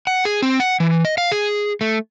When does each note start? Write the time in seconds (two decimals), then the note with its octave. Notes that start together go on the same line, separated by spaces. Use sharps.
0.07 F#5
0.25 G#4
0.42 C4
0.60 F#5
0.80 E3
1.05 D#5
1.18 F5
1.32 G#4
1.81 A3